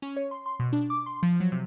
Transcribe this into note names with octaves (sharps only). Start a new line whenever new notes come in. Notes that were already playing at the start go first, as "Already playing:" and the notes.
C#4
C#5
C6
C6
B2
D4
D6
C6
F3
F#3
C3